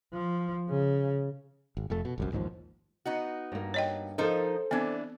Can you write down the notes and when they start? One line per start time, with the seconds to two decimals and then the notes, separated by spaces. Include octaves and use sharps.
0.13 F3
0.69 C#3
1.77 G#1
1.90 F1 F2 A3
2.05 B2
2.18 G1 C2 F#2
2.32 A1 D#2 G#2 F3
3.05 B3 D#4 F#4
3.52 G2 A#3
3.74 C#5 D#5 G5
4.18 F3 D#4 A4 A#4 C5
4.71 E3 B3 C4 D4